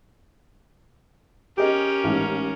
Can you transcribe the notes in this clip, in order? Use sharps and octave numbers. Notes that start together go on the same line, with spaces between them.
C#4 G4 G#4 A#4 D#5
A1 G#2